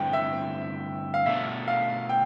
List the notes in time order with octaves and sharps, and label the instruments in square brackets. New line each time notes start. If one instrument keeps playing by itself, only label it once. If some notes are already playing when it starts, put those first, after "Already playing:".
Already playing: [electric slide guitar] G2 D3 A3 C4 E4 [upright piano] G5
[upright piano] E5
F5
[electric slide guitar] B2 A3 D4 [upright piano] E5
[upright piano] F5
G5